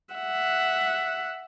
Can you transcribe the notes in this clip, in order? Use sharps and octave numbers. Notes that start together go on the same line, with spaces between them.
E5 F#5